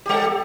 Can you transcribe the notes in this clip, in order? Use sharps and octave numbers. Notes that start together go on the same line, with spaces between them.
G3 G4 A4